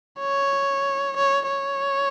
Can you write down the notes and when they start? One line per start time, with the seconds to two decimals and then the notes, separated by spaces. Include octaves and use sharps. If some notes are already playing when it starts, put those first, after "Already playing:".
0.20 C#5
1.17 C#5
1.48 C#5